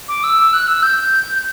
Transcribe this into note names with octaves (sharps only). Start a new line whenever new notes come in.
D6
E6
F#6
E6
G6
G6